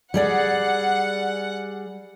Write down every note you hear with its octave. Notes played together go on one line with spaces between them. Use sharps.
G3 G#4 D5 F#5